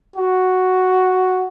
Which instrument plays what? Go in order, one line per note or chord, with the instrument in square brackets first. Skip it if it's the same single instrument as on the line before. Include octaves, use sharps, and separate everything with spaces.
[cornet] F#4